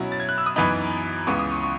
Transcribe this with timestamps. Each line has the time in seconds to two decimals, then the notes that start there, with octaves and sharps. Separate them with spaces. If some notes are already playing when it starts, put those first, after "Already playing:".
Already playing: B2 F#3 C#4 E4
0.12 A6
0.20 G#6
0.29 F#6
0.38 E6
0.46 D#6
0.56 F#2 E3 B3 D#4 B5
1.27 C#2 C#3 E3 B3 C#6
1.39 D#6
1.52 C#6
1.63 C#6